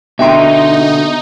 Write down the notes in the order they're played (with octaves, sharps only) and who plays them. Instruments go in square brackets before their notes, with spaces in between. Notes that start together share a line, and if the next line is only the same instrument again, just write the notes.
[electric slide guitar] B2 D3 [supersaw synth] D#4 [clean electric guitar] E5 G5 C6